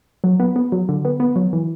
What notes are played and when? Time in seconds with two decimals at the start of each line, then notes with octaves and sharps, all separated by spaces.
0.24 F#3
0.40 B3
0.56 B3
0.72 F#3
0.89 D3
1.05 B3
1.20 B3
1.36 F#3
1.53 E3